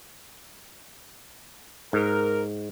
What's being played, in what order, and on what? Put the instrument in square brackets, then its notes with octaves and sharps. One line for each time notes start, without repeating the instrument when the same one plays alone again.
[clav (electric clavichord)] G#2 [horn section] A#4